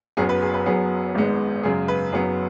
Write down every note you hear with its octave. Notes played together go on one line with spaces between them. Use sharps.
F#1 F#2 F#3 B3 G#4
B4
G#4
B4
F#1 F#2 F#3 B3 G#4
G#1 G#2 G#3 B3
F#2 C#3 G#3 G#4
B4
F#1 F#2 F#3 B3 G#4